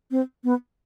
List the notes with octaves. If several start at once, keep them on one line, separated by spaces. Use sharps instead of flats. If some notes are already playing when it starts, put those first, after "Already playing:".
C4
B3